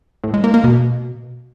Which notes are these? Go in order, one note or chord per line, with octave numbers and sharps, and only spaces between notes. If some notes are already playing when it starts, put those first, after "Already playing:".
A2
G#3
A#3
A#3
B2